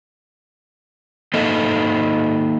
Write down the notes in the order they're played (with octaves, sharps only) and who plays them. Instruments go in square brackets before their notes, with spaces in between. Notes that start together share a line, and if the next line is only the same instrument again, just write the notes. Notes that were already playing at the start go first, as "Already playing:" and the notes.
[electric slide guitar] A#3 D#4 A4 D#5 E5